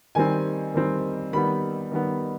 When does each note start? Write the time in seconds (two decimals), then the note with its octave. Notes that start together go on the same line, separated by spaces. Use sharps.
0.15 D#3 G3 C4 G#5
0.74 D#3 G3 C4
1.33 D#3 G3 B3 B5
1.92 D#3 G3 B3